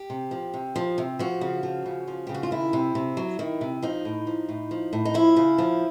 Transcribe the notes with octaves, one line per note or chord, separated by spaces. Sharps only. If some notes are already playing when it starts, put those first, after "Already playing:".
Already playing: G4
C3
F3
C3
F3
C3
F3 F#4
C#3
F3
C#3
F3
C#3 G4
F#4
F4
D#3 E4
C3
C3
F#3
D#3
C3
F3 D#4
A2
F3
A2
F3
A2
D#4
F3 E4
C#3
F3